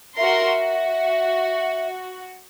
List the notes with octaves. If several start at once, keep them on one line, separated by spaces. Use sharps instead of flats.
F#4 A#4 E5 C6
F#4